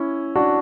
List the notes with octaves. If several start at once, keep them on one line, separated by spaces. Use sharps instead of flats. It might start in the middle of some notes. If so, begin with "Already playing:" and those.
Already playing: C#4 E4
D4 F#4